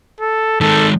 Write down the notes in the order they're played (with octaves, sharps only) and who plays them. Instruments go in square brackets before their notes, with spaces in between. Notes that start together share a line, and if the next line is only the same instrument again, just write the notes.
[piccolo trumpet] A4
[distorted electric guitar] D#3 G#3 [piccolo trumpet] A4